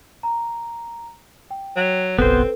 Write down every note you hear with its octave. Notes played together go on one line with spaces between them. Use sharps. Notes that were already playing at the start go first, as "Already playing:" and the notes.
A#5
G5
F#3
F#1 B1 B3 C4 A4 B4 C5